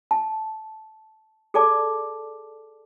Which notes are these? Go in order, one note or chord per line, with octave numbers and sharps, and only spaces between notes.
A5
G#4 A4 D5 A5 D6